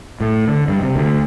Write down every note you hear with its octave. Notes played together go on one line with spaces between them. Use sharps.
A2
D3
G2
C3
D2